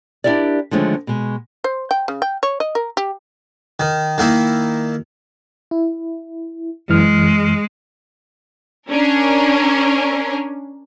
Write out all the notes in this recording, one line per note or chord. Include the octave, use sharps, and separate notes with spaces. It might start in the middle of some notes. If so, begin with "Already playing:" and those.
D4 E4 G4 A#4 D5
D3 D#3 F3 G#3 A3 C#4
B2 G#3
C5
G5
C#3
G5
C#5
D#5
A#4
G4
D#3
D#3 A#3 E4
E4
F#2 E3 G#3 F6
C#4 D4 A#4